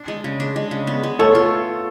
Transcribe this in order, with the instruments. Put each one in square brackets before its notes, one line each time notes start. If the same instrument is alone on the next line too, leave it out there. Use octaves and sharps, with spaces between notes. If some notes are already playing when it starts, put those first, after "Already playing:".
Already playing: [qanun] D4
G#3
C#3
D4
G#3
C#3
B3
G#3
[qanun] A3 [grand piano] A4 C#5
[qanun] F4